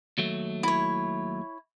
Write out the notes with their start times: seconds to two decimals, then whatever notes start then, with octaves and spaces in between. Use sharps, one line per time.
0.18 D#2 F#3 A3
0.63 E4 C#5